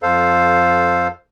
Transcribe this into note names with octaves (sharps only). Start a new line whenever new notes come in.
F2 A4 C5 F5